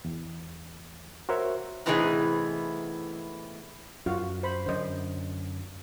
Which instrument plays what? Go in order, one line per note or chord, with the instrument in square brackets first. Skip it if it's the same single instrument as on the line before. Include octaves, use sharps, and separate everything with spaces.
[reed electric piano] E2
F#4 A#4 C5 C#5 E5
[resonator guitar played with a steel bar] A2 C3 E3 B3 D#4 G#4
[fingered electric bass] F#2 [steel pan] F4 F#4 F5
[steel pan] C5 B5
[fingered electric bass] F#2 D3 [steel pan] C5 D#5